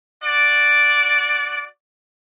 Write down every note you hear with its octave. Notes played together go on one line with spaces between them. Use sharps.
F#4 D5